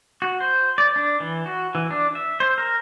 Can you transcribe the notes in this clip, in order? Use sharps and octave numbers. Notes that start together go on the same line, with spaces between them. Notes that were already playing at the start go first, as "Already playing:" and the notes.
F#4
C5
D5
D4
E3
F#4
E3
D4
E5
C5
A#4